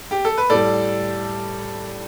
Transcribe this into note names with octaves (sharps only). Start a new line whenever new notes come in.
G4
A4
B4
A2 G3 A4 D5